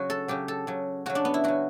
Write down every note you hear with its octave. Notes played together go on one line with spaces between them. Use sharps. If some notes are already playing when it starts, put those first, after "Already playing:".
Already playing: C#3 F#3 F#4
A4
C#3 F#3 G4
A4
C#3 F#3
C#3 F#3 F#4
D4
B3
E4
C#3 F#3 F#4